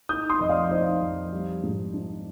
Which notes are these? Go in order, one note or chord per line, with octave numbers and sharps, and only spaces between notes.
D#4 D#6 G6
C6 D#6
F2 D#5
D5 F5
D#4 C5 D#5
F2
G3
G#2
D4